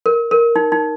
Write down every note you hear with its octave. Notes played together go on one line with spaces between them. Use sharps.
A#4
A#4
D#4
D#4